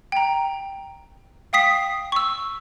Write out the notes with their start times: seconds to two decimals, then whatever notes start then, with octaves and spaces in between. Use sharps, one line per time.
0.12 G5 A#5
1.53 F5 G5 D#6 B6 C7
2.12 C#6 E6